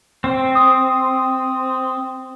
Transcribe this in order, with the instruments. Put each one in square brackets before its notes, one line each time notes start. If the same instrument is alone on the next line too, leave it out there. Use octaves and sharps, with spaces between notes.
[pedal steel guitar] C4
[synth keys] D#6